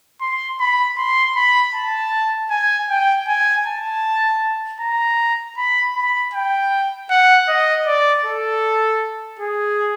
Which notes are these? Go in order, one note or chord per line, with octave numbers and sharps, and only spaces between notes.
C6
B5
C6
B5
A5
G#5
G5
G#5
A5
A#5
B5
B5
G5
F#5
D#5
D5
A4
G#4